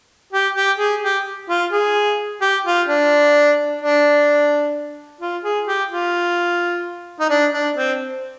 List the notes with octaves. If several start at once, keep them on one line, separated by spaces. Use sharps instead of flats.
G4
G4
G#4
G4
F4
G#4
G4
F4
D4
D4
F4
G#4
G4
F4
D#4
D4
D4
C4